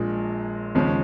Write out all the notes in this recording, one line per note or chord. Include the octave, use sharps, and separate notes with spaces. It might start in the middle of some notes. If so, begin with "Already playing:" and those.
Already playing: A#1 A#2 G#3
D#2 C#3 F3 G#3 C#4